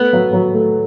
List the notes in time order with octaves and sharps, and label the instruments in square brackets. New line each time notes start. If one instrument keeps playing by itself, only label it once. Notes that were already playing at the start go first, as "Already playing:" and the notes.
Already playing: [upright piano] A3 [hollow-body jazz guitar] B3
[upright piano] F#3
F#3
A3